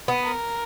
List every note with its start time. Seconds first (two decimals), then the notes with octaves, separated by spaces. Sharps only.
0.08 B3
0.23 A#4